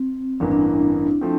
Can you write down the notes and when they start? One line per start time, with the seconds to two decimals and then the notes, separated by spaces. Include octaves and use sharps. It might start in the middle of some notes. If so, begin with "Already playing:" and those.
Already playing: C4
0.40 A1 G2 E3 A#3 D4
0.51 D4
0.61 E4
1.21 F3 A3 C4